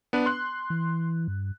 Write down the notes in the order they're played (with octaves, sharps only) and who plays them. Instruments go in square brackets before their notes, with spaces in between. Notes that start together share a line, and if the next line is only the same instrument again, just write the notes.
[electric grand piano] B3 D4 B4
C6 F#6
[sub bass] E3
G2